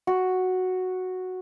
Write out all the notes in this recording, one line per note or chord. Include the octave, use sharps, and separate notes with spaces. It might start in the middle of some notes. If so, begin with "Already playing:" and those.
F#4